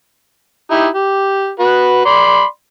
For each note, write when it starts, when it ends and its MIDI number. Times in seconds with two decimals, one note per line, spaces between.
0.71 0.87 63
0.71 0.87 64
0.71 0.87 67
0.94 1.49 67
1.60 2.03 66
1.60 2.03 71
2.05 2.44 74
2.05 2.44 83
2.05 2.44 84